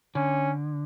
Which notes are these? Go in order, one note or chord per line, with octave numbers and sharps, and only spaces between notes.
D3 C#4